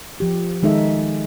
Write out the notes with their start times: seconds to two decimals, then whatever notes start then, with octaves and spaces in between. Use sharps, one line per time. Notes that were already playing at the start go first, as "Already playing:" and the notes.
0.20 F3 G4
0.63 D#3 G#3 D#4 A4 E5